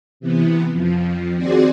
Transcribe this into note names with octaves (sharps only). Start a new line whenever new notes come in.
C3 E3 B3
F2 F3
D#2 C4 F#4 G#4 D5 C6